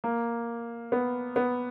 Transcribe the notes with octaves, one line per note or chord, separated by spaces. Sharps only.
A#3
B3
B3